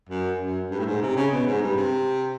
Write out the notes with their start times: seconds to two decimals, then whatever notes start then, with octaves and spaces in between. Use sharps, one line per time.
0.10 F#2
0.41 F#2
0.71 G2
0.80 A2
0.86 G#2
1.02 C3
1.17 C#3
1.32 B2
1.47 G#2
1.62 G2
1.77 C3